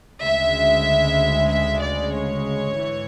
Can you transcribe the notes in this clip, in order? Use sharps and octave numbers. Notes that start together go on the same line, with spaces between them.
D2 C#3 G#3 E5
E5
D5
C#5
G#2 E3